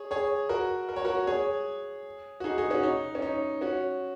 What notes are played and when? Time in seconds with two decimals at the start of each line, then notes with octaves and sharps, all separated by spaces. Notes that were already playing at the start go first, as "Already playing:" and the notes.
Already playing: G#4 C#5
0.11 G#4 C#5
0.49 F#4 A#4
0.89 A#4
0.96 C#5
1.05 F#4 A#4
1.27 G#4 C#5
2.40 F#4
2.44 D#4 G#4
2.58 D#4 G#4
2.70 C#4 F#4
2.83 D#4
3.15 C#4
3.22 D#4
3.61 C#4 F#4